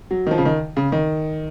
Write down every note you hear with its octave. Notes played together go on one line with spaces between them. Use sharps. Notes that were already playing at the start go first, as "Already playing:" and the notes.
F#3
D#3
F3
C#3
D#3
C#3
D#3